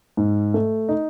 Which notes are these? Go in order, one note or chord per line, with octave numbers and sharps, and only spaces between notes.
G#2
A3
D#4